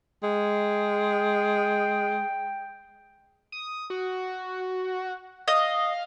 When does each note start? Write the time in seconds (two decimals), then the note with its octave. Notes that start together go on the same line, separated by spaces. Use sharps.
0.23 G#3 G5
3.52 D#6
3.90 F#4
5.48 D#5 F5